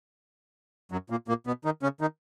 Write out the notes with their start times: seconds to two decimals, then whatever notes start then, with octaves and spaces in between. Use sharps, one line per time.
0.92 F#2 F#3
1.10 A#2 A#3
1.28 A#2 A#3
1.47 B2 B3
1.65 D#3 D#4
1.83 C#3 C#4
2.01 D#3 D#4